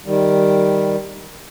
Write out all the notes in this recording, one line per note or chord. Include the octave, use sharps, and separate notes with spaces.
D#3 G3